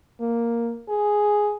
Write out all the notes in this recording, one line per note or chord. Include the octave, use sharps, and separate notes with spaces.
A#3
G#4